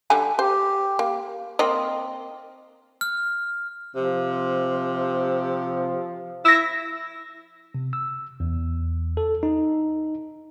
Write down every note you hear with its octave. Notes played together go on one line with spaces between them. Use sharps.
D3 G3 G#5
G4 C5
A#3
A#3 C4 D#5
F6
C3 F3
E4 E6 A#6
C3
E6
E2
A4
D#4